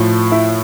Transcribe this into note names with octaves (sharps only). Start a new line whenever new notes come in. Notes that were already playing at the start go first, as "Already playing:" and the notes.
Already playing: A2 F3
E4